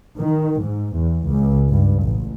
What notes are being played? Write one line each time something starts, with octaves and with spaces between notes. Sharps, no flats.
D#3
G#2
E2
C#2
G2
A1